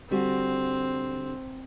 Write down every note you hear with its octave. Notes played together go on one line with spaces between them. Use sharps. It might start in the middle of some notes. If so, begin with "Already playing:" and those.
D3 G3 C4 F#4